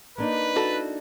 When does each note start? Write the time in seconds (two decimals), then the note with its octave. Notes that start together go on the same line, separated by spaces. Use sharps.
0.18 A#3 D4 D#4 B4
0.56 E4 F#4 A4